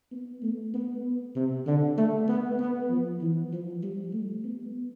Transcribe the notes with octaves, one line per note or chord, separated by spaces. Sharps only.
B3
A3
B3
C3
D3
A3
B3
B3
F3
E3
F3
G3
A3
B3